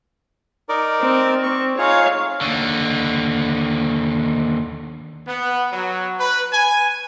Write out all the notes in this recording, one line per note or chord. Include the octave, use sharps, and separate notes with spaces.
D#4 A#4 D5
C4
C4 C#6
D#4 F4 G#4 C#5 F5
D#2 D3
B3
F#3
B4
G#5